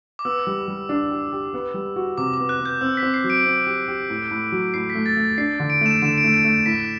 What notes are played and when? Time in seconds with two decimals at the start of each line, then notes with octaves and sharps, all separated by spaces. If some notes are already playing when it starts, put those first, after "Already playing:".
0.19 D6
0.25 B3 E6
0.47 G3
0.68 G3
0.89 D4
1.11 G4
1.33 G4
1.54 B3
1.74 G3
1.96 F#4
2.18 C3 D6
2.34 D6
2.39 B3
2.49 F#6
2.60 B3
2.66 G6
2.81 C4 E6
2.97 B6
3.03 C4
3.14 C7
3.24 F#3
3.30 D7
3.46 C4
3.67 G4
3.88 G4
4.10 A2
4.31 A2
4.52 F#3
4.74 A2 C7
4.90 B6
4.95 A3
5.06 A6
5.17 A3
5.38 D4 C7
5.60 D3
5.70 D7
5.81 A3 E7
6.02 D3 E7
6.18 D7
6.24 A3
6.34 D7
6.44 A3
6.66 A2 B6